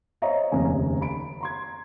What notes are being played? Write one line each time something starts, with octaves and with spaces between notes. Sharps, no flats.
C5 C#5 D#5 E5 A#5
F1 D#2 C#3 G#5 A#5
B5 D7
A#5 C6 G#6